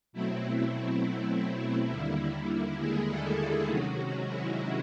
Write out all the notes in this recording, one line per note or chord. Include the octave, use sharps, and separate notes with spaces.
B2 F#3 A3 C4 E4
E4
D#2 D3 G3 A#3
G#3 G#4
A3 A4
G#3 G#4
C3 D#3 F#3 G#3 C#4 F#4
E4